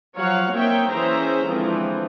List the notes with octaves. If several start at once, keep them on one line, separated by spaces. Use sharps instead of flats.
F3 F#3 F#4 C#5 F5 F#5
A#3 C4 D#4 C#5 E5 G5
E3 C#4 G#4 C5 E5 A#5
D3 E3 F3 G#3 C4